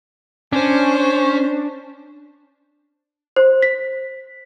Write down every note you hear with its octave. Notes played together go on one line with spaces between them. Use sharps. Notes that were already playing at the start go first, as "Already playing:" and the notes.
C#4 D4 C5
C5
B6